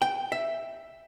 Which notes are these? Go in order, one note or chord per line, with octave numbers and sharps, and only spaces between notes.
G5
E5